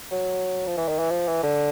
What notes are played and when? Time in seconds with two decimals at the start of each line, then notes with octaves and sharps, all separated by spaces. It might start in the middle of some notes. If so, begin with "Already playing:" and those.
0.11 F#3
0.67 F3
0.77 E3
0.88 D#3
0.99 E3
1.11 F3
1.28 E3
1.43 D3